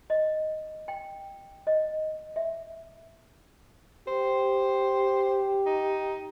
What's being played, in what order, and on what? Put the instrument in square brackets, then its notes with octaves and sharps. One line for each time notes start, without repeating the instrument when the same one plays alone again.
[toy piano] D#5
G5
D#5
E5
[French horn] G4 [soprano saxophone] C5
[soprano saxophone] D#4